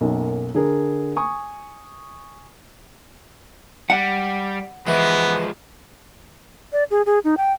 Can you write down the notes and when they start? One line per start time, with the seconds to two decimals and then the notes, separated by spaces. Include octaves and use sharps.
0.01 B1 F#2 A#3
0.55 D3 G#4 A#4
1.16 G#5 C#6 D#6
3.90 G3 F#5
4.87 E3 F3 G#3 B3
6.73 D5
6.91 G#4
7.06 G#4
7.24 D#4
7.37 G5